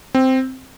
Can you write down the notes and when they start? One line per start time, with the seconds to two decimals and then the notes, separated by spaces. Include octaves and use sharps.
0.15 C4